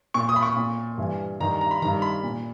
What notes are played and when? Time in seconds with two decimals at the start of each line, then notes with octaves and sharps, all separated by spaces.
0.14 A#2 C#6
0.29 D#6
0.36 B5
0.43 C#6
0.57 A#2
0.98 G2 E3
1.40 G2 D#3 A#5
1.51 A#5
1.61 A#5
1.71 B5
1.82 D#3 A#5
1.85 G2
2.02 B5
2.23 A#2